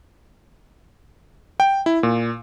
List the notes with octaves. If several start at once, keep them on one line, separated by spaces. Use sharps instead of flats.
G5
E4
A#2